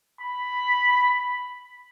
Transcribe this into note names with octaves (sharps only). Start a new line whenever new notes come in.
B5